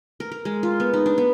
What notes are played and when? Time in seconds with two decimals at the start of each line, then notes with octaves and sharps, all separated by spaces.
0.20 A#4
0.32 A#4
0.45 G#3
0.63 F4
0.80 B3
0.94 D#4
1.06 D4
1.18 B3